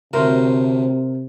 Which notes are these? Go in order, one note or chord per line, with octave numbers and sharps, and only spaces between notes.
D2 A2 C3 A#4 C5